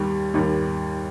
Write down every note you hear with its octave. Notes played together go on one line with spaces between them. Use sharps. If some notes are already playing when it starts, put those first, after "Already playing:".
Already playing: D#2 D#3 G3
D#2 D#3 G3